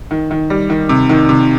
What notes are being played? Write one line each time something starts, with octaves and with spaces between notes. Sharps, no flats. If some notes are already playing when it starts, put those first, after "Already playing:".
D#3
D#3
G3
D#3
C3
D#3
C3